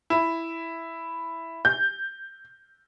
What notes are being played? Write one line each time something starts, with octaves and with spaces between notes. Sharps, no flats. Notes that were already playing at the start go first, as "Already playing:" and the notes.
E4
G6